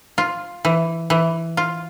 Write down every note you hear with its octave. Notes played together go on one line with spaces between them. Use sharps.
F4
E3
E3
F4